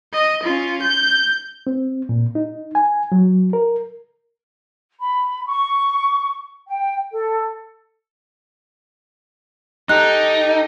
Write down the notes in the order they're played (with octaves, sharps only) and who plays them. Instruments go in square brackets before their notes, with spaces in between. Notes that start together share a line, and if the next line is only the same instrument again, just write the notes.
[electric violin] D#5
C#4 F4
G6
[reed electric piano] C4
A#2
D#4
G#5
F#3
A#4
[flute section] B5
C#6
G5
A4
[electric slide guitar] D#4 [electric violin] G4 A4 [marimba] F#6